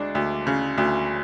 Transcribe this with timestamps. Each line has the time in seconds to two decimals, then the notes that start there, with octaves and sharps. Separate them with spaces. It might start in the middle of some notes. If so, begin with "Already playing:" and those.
Already playing: D2 G#3 D4
0.15 D2
0.47 C#3
0.78 D2